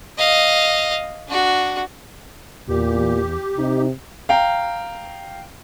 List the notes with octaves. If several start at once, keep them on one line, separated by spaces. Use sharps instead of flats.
D#5 F5
D4 F#4
E2 A#2 G4
C3 D#4
F5 G5 A#5